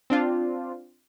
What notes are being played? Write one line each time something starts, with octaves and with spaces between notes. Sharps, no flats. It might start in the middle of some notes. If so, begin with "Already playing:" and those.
C4 D4 F4